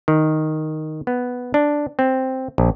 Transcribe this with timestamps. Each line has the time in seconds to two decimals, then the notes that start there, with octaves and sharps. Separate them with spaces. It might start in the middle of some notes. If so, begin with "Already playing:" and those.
0.08 D#3
1.07 B3
1.54 D4
1.99 C4
2.58 A#1